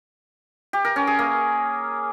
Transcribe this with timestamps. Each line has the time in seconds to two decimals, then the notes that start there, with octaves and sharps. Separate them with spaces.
0.73 G4
0.85 A#4
0.96 C#4
1.07 G#4
1.19 A#3